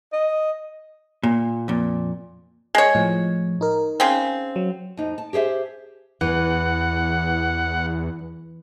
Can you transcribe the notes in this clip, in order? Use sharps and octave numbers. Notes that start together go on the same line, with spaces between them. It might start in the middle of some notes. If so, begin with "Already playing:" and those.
D#5
A#2
F2 A#2
G#3 C#5
A2 F3
D#4 A#4
C#3 C4
F#3
F2 D#4
A5
G4 G#4 C5 E5
E2 E3 F#5